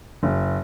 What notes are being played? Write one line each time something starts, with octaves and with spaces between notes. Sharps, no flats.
F#1